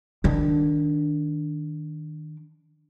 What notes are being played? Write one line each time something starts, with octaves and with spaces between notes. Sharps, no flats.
D#3 D4